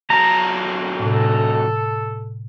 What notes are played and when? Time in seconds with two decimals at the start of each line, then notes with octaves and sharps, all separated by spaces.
0.10 E2 F#3 A5 A#5
0.99 A2 C3 A4